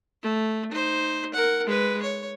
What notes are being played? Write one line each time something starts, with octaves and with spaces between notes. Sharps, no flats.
A3
D#4 C5
A#4 F#5
G#3 B4
C#5